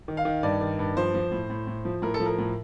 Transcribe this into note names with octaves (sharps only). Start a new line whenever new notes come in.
D#3
F5
D#3
G2 D5
D#3
G2
F3 C5
F3
A2
A2
A2
F3
A2 A#4
A4
F3
A#4
A2